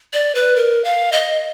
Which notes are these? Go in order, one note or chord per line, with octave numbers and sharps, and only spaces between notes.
D5
B4
A#4
F5
D#5